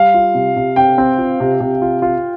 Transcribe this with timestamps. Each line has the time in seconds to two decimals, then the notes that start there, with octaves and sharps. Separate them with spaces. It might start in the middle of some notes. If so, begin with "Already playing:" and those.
Already playing: G3 F5
0.14 F4
0.35 C3
0.57 C3
0.76 C4 G5
0.98 C4
1.18 F4
1.40 C3
1.60 C3
1.82 F4
2.02 F4